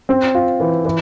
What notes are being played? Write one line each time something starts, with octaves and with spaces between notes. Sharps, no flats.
C4
F4
E3
E3